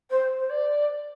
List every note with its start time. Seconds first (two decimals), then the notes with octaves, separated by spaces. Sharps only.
0.10 C5
0.38 C5
0.49 D5